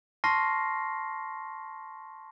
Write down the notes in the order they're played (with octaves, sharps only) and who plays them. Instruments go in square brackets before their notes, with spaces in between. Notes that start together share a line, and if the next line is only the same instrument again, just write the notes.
[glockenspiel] A5 C6 C#6 F6 A#6 C7